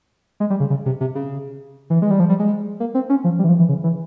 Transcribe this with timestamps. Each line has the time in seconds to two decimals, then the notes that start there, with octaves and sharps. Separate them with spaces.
0.40 G#3
0.50 G3
0.60 C#3
0.70 C#3
0.86 C3
1.01 C3
1.15 C#3
1.90 E3
2.02 G#3
2.11 G3
2.20 F3
2.29 G3
2.39 G#3
2.80 A#3
2.94 C4
3.09 C#4
3.24 F3
3.39 G3
3.44 E3
3.49 F3
3.59 E3
3.69 C#3
3.84 E3